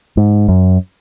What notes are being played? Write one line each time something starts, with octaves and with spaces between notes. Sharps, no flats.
G#2
F#2